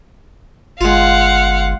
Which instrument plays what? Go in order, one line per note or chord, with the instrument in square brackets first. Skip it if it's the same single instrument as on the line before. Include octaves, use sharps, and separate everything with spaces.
[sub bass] G1 [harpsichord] G#3 F4 [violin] F5 F#5